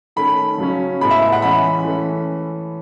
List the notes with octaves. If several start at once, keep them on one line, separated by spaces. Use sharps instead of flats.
D#3 A3 C#4 B5
C#3 F#3 C#4
A2 G#3 B3 B5
E5
E5
F#5
E3 G#3 C#4 B5
E3 A3 C#4